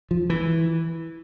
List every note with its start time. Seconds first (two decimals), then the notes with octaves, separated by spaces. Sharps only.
0.11 F3
0.30 E3